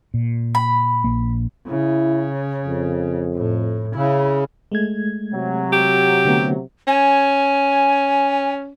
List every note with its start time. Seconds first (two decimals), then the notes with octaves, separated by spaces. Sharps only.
0.14 A#2
0.55 B5
1.04 A#1 A#3
1.68 C#3 E4
2.64 F2
3.35 A2
3.96 C#3 E4
4.72 G#3 A3 G#6
5.33 C3 F#3
5.73 G4
6.25 D3 A3 B3
6.87 C#4 G#5